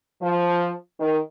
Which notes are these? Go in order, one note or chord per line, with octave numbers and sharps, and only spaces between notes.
F3
D#3